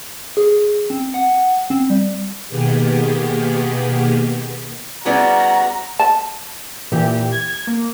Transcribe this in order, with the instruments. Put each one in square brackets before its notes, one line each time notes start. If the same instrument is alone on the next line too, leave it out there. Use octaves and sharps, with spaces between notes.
[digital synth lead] G#4
C4
F#5
C4
G3
[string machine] B2 D#3 A#3 B3 G4 G#4
[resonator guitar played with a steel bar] G3 B3 C#4 [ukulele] E4 G#4 D5 [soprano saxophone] F#4 [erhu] A#5
[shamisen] A5
[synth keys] A#2 E3 G4
G#6
A#3